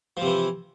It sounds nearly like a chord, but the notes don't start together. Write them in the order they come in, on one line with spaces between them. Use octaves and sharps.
F3 C3 E3